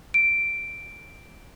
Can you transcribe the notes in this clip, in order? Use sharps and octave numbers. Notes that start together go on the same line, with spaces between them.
D7